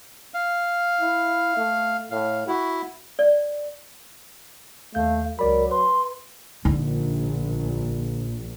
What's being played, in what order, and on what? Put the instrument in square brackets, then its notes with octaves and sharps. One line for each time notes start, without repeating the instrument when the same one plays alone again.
[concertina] F5
[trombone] E4
A3
[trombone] A2 [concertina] F5
[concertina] E4 [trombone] F#4
[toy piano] D5
[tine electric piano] D#2 G6 [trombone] A3 [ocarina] F5
[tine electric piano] C#2 D5 B5 [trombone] F#3 [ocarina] A#4
[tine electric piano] B4 [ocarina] C6
[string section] A#1 [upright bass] D3 D#4